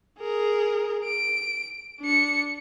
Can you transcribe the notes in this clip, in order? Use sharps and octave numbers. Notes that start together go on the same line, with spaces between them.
G#4 A#4
D7
D4 C#7